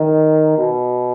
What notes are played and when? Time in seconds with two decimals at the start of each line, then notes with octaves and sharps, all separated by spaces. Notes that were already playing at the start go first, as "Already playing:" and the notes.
Already playing: D#3
0.58 B2